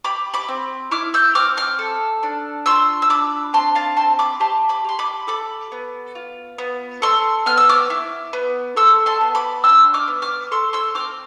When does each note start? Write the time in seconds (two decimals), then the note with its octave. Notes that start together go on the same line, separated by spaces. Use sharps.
0.05 G4 B5 D6
0.34 B5 D6
0.49 C4
0.91 E4 D6 F6
1.14 E6 G6
1.35 C4 D6 F6
1.57 D6 F6
1.79 A4
2.23 D4
2.66 F4 C6 E6
3.02 E6
3.09 D4 B5 D6
3.53 C4 A5 C6
3.75 F5 A5
3.97 C4 A5 C6
4.19 B5 D6
4.40 G4 A5 C6
4.69 B5 D6
4.85 G4 C6
4.99 B5 D6
5.27 A4 B5 D6
5.72 B3
6.15 F4
6.58 B3
7.02 A4 C6 E6
7.46 B3 F6
7.57 E6
7.69 D6 F6
7.90 E4
8.33 B3
8.76 A4 C6 E6
9.06 A5 C6
9.21 B3
9.35 B5 D6
9.64 D4 C6 E6
9.94 D6 F6
10.08 B3
10.22 D6 F6
10.52 A4 C6 E6
10.73 C6 E6
10.95 C4 D6 F6